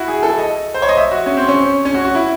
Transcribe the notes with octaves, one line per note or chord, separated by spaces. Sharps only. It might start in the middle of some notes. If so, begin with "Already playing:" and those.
Already playing: E4 F#4
G#4
A4
D#5
C5
C#5
D#5
E5
F#4
C#4
C4
C#4
C#4
F#4
F#4
E4